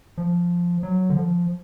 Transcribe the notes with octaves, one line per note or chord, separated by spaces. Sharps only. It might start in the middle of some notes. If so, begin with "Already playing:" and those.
F3
F#3
D3
F3